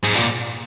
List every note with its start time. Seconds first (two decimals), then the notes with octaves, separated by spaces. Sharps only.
0.03 G#2
0.15 A#2